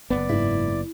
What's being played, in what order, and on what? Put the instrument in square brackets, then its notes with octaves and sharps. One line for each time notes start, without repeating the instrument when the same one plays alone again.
[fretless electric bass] F#1 F2 B3 [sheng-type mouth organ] D5
[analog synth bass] G#2 [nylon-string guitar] E4